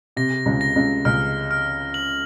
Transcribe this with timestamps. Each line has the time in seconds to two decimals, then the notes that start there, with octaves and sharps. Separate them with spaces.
0.17 C3 A#6
0.46 C#2 C#3
0.61 A#6
0.76 C#2 C#3
1.05 C#2 C#3 F6
1.51 F6
1.94 F#7